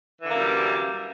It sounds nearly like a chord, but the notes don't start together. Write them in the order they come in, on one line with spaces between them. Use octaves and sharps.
E3 D3 A#3 F#2 G3